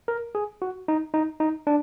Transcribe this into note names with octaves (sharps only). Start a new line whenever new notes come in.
A#4
G#4
F#4
D#4
D#4
D#4
D4